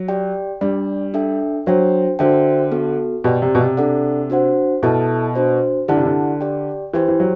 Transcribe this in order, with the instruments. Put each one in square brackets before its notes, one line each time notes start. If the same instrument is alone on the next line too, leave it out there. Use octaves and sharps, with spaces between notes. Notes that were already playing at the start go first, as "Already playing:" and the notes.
Already playing: [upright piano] F#3
[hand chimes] G4 D5 G5
[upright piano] G3 [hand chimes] D4 G4 D5
[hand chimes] D4 A4 E5 G5
[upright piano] F#3 [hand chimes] D4 F#4 C5 G5
[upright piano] D3 [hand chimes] F#4 C5 E5 G5
[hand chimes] B3 F#4 A4
[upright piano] B2 [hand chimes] G4 D5 G5
[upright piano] C3
B2
C3
[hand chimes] D4 A4 D5 F#5
D4 F#4 C5 F#5
[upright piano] B2 [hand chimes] E4 A4 E5 A5
[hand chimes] D4 F#4 C5
[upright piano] D3 [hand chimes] E4 G4 D5 F#5 A5
[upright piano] C3
D3
[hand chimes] G4 D5 G5
[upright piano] E3 [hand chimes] E4 G4 C5 G5
[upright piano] E3
F#3